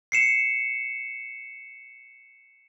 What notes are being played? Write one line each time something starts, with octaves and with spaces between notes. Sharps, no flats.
C7 C#7 E7